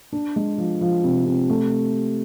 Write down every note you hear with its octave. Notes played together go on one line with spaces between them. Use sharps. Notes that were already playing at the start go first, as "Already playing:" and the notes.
D4
G#3
F3
F3
C3
C3
A3